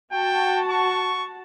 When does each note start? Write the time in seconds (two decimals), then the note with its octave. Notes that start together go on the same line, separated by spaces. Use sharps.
0.12 F#4 G5 A5
0.70 C#6